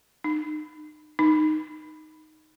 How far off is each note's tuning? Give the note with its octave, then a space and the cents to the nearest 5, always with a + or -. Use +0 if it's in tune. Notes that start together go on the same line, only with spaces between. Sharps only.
D#4 -40
D#4 +0